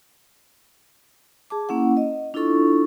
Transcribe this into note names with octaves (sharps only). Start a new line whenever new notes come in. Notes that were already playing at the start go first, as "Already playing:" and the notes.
G#4 A5 D6
A#3 C#4 E4 F#5
D#5
D4 E4 F4 A4 C#6